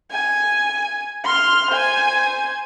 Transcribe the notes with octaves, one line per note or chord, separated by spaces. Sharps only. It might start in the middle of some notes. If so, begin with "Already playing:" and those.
G#5
C6 F6
C5 G#5